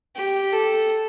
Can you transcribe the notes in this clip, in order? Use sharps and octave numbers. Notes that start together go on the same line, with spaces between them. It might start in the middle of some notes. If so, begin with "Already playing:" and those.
G4
A4